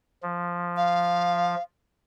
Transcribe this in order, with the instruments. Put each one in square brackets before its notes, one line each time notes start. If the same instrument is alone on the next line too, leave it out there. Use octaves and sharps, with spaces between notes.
[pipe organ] F3
[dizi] F5